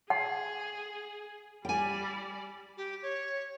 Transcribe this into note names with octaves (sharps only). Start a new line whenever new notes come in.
G#4 F#5
G3 D5 G5 G#5
G4
C#5